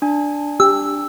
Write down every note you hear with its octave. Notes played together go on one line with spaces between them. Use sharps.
D4 G#5
G4 E6